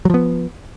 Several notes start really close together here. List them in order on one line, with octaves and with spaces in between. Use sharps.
F#3 F3 B3